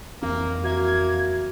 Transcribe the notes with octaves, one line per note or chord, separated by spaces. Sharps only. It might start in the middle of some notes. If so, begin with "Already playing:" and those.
F2 E3 A#3 C4
A#3 F#4 E5 G#6